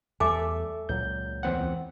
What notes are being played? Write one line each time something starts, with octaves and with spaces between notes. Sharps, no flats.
E2 G3 A4 E5 G#5 D6
C#2 A#2 F#3 G6
E2 C4 F#5